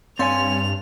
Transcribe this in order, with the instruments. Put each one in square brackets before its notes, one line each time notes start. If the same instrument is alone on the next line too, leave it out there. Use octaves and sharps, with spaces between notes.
[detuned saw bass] G2 [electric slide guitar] C4 C#5 G#5 [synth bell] F5 C6 A6 [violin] F7